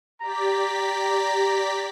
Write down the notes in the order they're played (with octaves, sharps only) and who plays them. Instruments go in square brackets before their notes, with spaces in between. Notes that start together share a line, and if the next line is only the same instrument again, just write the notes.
[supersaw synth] G4 D5 B6 [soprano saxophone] A#5